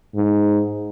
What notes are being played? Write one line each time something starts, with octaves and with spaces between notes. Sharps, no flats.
G#2